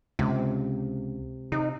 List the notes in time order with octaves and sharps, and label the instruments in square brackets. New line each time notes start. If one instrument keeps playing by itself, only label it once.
[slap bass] C#2 [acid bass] C3
[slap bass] C3 [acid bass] D#4